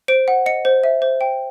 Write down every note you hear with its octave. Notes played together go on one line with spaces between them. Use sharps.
C5 D7
F#5
D#5 C#7
C5
E5
C5
G5